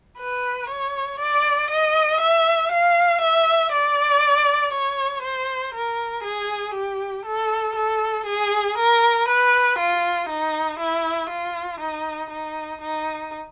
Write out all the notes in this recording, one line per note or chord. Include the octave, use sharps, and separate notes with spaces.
B4
C#5
D5
D#5
E5
F5
E5
D5
C#5
C5
A#4
G#4
G4
A4
A4
G#4
A#4
B4
F4
D#4
E4
F4
D#4
D#4
D#4